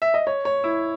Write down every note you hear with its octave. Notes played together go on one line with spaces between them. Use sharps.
E5
D#5
C#5
C#5
E4